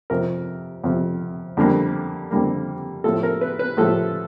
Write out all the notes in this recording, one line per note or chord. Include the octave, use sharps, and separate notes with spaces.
F2 C3 F3 A#4
F2 C3 F3
F2 D3 G3 A#3
F2 D3 G3 A#3
A2 F3 A3 A4
A#4
B4
B4
A2 F3 A3 A4